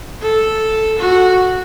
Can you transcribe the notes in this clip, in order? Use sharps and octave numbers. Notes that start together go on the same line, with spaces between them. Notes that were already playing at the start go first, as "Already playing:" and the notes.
A4
F#4